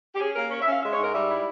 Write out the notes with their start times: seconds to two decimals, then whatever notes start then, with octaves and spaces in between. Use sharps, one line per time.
0.15 G4
0.19 C#4 G#4
0.35 A#3 A#4
0.50 C#4 C#5
0.62 E5
0.67 C#4 F5
0.82 G#3 E5
0.93 C#5
0.98 G#2 A#4
1.14 G3 E5
1.29 E4